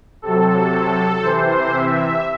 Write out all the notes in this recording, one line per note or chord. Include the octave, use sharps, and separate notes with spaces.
C3 F#3 A4
C3 E3 C5
E5